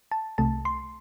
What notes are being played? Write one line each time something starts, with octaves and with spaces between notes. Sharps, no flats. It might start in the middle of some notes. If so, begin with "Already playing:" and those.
A5
C2 C3 A3 A5
C6